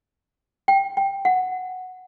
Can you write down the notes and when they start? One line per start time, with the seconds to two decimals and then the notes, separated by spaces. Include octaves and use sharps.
0.68 G5
0.97 G5
1.25 F#5